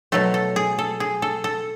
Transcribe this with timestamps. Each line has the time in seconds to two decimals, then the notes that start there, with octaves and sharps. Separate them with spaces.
0.12 B2 F#3 A3 A4
0.34 A4
0.56 G#4
0.79 A4
1.00 G#4
1.22 A4
1.44 A4